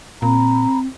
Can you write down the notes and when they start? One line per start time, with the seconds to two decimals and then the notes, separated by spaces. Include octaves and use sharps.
0.22 A#2 C4 A#5 B5